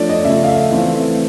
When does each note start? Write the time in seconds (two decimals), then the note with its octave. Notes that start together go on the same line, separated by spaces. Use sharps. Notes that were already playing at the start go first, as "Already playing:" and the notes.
Already playing: F3 A3 D4 C#5 D5
0.09 D#5
0.24 C#3 F3 A3 E5
0.43 F5
0.48 E5
0.71 E3 A3 C4 F4 F5